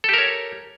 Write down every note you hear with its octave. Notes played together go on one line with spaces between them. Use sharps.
G4 A4 A#4 C#5